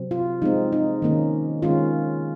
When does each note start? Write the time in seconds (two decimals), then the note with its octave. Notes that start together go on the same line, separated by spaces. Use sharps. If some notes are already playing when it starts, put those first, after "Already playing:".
Already playing: C3 F#3 C4
0.11 F4
0.42 F3 G#3 C4 D#4
0.72 D#4
1.02 D#3 A#3 C#4
1.62 D#3 G#3 C#4 F4